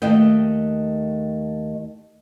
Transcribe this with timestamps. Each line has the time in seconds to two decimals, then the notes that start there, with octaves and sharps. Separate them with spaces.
0.02 D#2 A3 D#5 G5